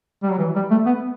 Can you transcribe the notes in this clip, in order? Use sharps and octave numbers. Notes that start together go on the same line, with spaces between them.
G3
F#3
E3
G3
A3
B3